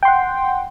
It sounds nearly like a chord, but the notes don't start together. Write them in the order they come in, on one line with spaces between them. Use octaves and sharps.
G5 C6 F#5